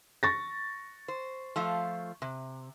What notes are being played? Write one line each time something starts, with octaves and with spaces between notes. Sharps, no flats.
C#6 A6 A#6
C5
F3 A3 F4
C3